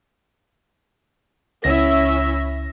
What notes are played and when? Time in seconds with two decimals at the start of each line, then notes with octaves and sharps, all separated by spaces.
1.64 C#2 C#4 E4 E5 A#6